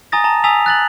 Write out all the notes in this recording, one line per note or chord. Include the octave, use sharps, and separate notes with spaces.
G#5 A#5 D#6 A6 A#6
A5 A#5
G#5 A#5 D#6 E6 B6 F7
F#6 A6 F#7